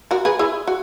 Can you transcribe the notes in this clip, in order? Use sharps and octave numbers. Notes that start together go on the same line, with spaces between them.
F#4 A#4
G#4 B4
E4 G#4
F#4